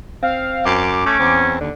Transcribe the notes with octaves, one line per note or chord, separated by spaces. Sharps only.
C4 F5
F#2 D6
A3 C#4
E2 C4
D#2 D3